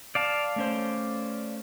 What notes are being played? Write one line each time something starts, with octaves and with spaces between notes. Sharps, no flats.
D5 F5 A5
A3 C#4 C5